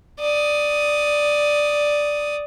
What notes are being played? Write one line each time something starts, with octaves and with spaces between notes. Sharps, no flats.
D5 D#6